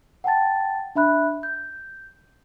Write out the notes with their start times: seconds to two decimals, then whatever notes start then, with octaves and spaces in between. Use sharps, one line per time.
0.24 F#5 G5 A5 A6
0.95 D4 E5 B5 F#6
1.43 G6